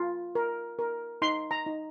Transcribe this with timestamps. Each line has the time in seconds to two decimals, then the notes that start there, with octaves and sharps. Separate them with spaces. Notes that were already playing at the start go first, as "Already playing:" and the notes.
Already playing: F4
0.35 A#4
0.79 A#4
1.22 D#4 C6
1.51 A#5
1.66 D#4